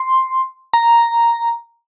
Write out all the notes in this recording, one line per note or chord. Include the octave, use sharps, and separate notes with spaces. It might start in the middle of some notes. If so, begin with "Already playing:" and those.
Already playing: C6
A#5